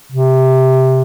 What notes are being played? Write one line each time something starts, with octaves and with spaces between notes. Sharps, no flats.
C3